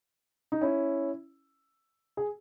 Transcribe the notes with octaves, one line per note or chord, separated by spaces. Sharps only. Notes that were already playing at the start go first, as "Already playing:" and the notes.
D#4
C#4 E4
G#4